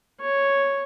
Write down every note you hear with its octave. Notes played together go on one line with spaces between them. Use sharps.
C#5